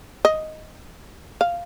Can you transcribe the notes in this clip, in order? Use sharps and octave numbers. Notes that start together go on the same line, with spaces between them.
D#5
F5